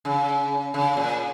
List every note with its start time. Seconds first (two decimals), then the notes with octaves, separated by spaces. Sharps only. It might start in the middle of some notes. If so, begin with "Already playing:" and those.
0.05 C#3
0.74 C#3
0.97 A#2